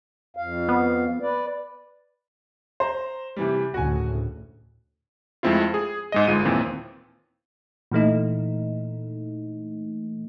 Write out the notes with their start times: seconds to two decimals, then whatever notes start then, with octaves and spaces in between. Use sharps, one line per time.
0.37 F2 F5
0.69 B3
1.22 B4 D5
2.80 C5 A#5
3.36 C3 E3 G3
3.74 D2 A2 C#3 F#4 G#5
5.43 F2 G#3 A3 C4 E4 F4
5.74 G#4
6.12 G#2 G#3 D#5
6.27 G1 G#3 F4 D#7
6.45 D#2 A#2 E3 C4
7.91 A#2 E3 A3 D#4